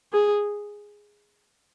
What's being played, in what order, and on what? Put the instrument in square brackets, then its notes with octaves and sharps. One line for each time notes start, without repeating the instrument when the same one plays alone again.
[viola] G#4